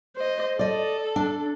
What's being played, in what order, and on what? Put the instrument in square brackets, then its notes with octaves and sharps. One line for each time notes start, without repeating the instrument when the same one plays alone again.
[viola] C5 D#5
[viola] A4 [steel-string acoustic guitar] D5 D#5
[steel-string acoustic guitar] D4